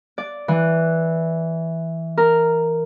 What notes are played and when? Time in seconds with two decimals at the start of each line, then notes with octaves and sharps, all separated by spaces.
0.18 D5
0.48 E3
2.18 A#4